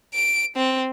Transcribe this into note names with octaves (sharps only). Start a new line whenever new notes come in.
D7
C4